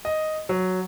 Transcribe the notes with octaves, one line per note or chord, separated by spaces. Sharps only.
D#5
F#3